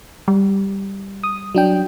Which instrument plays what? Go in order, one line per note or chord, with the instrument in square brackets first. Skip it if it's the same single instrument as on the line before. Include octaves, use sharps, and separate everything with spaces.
[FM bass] G3
[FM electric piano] D#6
F#3 D4 G5